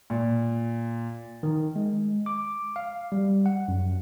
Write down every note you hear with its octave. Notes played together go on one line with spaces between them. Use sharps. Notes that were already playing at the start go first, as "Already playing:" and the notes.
A#2
D#3
G#3
D6
F5
G3
F#5
F#2